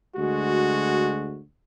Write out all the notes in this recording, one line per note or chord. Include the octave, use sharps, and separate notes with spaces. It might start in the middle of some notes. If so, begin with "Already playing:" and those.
D2 G#3 F#4